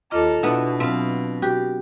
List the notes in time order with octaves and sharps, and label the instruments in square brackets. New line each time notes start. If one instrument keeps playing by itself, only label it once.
[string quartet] D#2 A4 A#5 [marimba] F4 D#5 D6
[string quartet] B2 [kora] B3 D4 E4
[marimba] F#3 C4 [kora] E5 F5
[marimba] F#4 [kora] G4